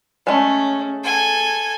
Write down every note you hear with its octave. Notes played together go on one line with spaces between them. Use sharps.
G#3 A3 C#4
A4 G#5